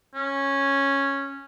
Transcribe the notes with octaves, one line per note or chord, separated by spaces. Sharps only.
C#4